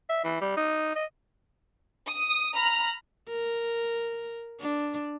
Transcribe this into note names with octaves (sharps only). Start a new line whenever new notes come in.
E5
E3
G3
D#4
D#5
D#6
A#5 B5 F6
A#4
D4